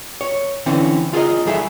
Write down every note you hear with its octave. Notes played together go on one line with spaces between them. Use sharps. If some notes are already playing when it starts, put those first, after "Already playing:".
C#5
D3 E3 C4 C#4
F4 G#4 A#4 D#5
D#2 G3 G#4 A4 E5